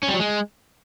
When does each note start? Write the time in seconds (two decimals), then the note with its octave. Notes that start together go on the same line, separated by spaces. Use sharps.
0.03 C#4
0.08 G3
0.14 F#3
0.20 G#3